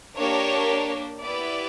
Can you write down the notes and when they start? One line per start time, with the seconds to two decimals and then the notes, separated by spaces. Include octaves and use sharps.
0.17 A#3 D4 G4 A#4 C#5
1.22 B3 E4 G4 B4 D5